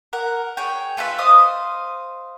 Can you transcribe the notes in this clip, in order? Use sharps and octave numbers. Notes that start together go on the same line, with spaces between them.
A#4 F#5
G#4 C#5 G5
A3 F4 B4 E5
C5 D#5 F5 D#6